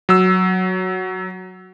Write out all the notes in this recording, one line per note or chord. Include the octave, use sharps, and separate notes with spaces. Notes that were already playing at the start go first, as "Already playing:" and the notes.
F#3 E6